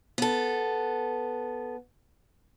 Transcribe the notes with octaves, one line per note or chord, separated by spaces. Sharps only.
B3 A4